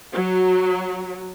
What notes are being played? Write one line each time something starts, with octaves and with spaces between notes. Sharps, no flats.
F#3